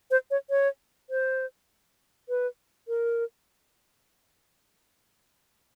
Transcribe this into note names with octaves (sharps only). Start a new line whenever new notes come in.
C5
C#5
C#5
C5
B4
A#4